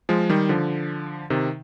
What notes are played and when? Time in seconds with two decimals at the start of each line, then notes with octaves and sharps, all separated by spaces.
0.09 F3 G#3
0.30 D#3 G3
0.49 D3 F3
1.30 C3 D#3